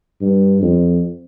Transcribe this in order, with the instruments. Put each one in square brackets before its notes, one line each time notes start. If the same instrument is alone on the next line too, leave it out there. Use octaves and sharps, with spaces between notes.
[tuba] G2
F2